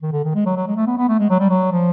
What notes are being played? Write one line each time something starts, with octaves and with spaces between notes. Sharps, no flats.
D#3
D3
D#3
G#3
F#3
F#3
G#3
A3
B3
B3
A3
G#3
F#3
G3
F#3
F3